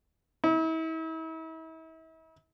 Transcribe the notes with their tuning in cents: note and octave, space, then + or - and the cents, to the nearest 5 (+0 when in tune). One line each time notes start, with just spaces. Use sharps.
E4 -40